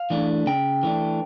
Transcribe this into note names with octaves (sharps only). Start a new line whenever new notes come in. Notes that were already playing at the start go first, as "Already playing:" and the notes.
Already playing: F5
E3 A3 D4
C#3 G5
E3 A3 D4